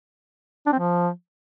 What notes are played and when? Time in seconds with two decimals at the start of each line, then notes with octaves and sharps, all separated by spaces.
0.66 D4
0.73 C4
0.79 F3